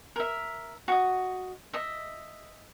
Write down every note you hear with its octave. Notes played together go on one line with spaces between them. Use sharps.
A#4 E5
F#4 D#5
D#5 E5